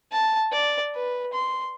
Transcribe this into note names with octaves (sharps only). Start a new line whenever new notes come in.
A5
D5
B4
C6